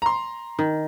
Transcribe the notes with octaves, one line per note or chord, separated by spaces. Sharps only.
A#5 C6
D#3